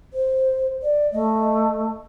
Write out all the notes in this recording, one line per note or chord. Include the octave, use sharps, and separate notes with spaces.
C5
D5
A3 D#5